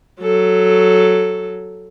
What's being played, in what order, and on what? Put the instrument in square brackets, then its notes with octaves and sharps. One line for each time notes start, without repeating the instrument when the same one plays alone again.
[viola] F#3 A4